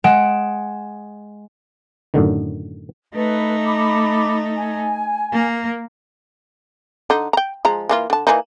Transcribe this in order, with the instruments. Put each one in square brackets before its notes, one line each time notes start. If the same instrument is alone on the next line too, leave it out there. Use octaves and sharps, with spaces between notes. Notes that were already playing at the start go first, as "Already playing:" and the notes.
[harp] G#3 F#5 D7 E7
[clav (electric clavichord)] F#2 A2 D3 D#3
[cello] A3 D#4 [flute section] B4
[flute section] B5 D6
G#5
[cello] A#3
[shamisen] D3 D#4
G5 A#5
F3 G#3 A#5
E3 A#3 F4
D3 A5
E3 A#3 D#4